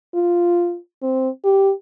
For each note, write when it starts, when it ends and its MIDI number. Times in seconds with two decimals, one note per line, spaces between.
0.15 0.77 65
1.03 1.29 60
1.45 1.72 67